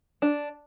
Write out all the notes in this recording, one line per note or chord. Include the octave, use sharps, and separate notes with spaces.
D4